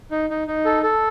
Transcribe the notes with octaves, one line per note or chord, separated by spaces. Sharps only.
D#4
D#4
D#4
A4
A4